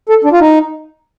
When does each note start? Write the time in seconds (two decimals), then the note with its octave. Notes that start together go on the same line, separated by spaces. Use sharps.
0.09 A4
0.24 D4
0.32 F4
0.40 D#4